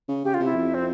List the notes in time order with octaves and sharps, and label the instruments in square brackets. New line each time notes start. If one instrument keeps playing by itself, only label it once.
[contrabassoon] C#3
[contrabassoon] C#3 [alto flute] G4
[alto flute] F4
[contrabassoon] C3
[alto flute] E4
[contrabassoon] F2
[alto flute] C4